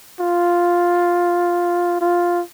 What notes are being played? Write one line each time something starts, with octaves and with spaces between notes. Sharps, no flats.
F4
F4